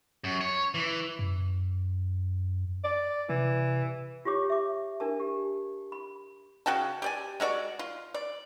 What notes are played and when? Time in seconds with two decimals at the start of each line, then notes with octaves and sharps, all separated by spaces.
0.24 F#2
0.41 C#5
0.74 E3
1.19 F#2
2.84 D5
3.29 C3 E3
4.25 F4 G4 C#5 D6
4.50 E5 D6
5.00 D4 A#4 A5
5.20 G4
5.92 B5
6.66 C#3 F#4 G5 A5
7.02 G4 D5 G#5
7.40 G#3 A3 F#4 D5
7.79 F4
8.14 D5